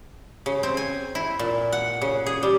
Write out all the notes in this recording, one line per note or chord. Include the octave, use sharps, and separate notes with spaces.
C#3
C4
G#5
E4
A#2
F#5
C#3
G#4
G3